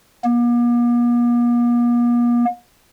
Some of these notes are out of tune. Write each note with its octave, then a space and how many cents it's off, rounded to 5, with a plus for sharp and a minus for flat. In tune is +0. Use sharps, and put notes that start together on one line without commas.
A#3 +45